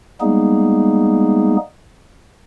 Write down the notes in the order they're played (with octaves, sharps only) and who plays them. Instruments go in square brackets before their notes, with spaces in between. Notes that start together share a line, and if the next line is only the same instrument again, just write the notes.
[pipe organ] G3 G#3 A#3 B3 D#4 G#4